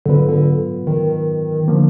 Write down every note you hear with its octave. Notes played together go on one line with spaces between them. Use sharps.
G#2 D3 F#3 B3 F4 B4
D3
D#3
D3 F3 A#3